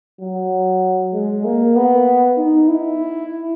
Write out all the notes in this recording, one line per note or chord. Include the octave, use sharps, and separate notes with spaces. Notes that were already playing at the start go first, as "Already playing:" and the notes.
F#3
G#3
A#3
B3
D#4
E4